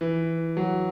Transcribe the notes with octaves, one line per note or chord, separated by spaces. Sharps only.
E3
F#3